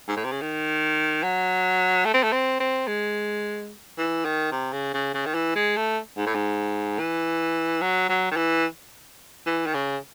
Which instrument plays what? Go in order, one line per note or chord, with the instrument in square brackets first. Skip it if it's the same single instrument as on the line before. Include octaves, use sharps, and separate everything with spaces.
[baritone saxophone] G#2
A2
C3
C#3
D#3
F#3
A3
C4
A3
C4
C4
G#3
E3
D#3
C3
C#3
C#3
C#3
D#3
E3
G#3
A3
G#2
A2
G#2
E3
F#3
F#3
D#3
E3
E3
D#3
C#3